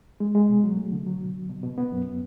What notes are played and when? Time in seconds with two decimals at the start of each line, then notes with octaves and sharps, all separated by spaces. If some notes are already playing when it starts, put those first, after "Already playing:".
0.20 G#3
0.35 G#3
0.49 B2
0.64 F#3
0.77 A3
0.92 D3
1.06 F#3
1.21 B2
1.35 C2
1.49 B2
1.63 B2
1.78 B3
1.92 F#2